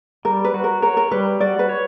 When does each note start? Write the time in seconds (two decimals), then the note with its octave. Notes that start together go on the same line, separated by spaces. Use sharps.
0.25 G3 A#4
0.44 B4
0.54 F#4
0.64 A#4
0.82 A#4 C#5
0.97 A#4
1.11 G3 B4
1.40 F#4 D5
1.59 B4
1.69 C#5